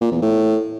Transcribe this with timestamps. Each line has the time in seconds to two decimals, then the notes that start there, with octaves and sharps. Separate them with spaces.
0.01 A#2
0.12 E2
0.22 A2